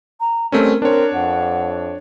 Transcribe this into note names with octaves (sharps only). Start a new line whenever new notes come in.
A#5
G3 A3 C4 C#4 A#4
C4 D4 A#4 C#5
F2 F#5